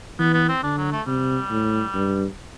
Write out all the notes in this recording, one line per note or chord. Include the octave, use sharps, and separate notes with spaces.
E3 B3
B3
C4
D3 D4
F#3
A3
C3 G3
A2
G2